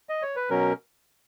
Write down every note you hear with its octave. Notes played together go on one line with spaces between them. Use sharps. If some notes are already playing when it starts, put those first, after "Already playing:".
D#5
C#5
B4
B2 F#3 C#4 A#4